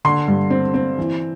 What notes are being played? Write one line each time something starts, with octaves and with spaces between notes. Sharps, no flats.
D3 C6
G2
C4
C4
E3